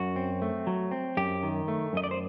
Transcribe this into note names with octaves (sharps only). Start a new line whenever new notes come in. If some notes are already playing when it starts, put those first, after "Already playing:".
Already playing: F#2 F#4
C4
A3
F#3
C4
F#2 G4
D#3
A3
F#2 D#5
D5
C5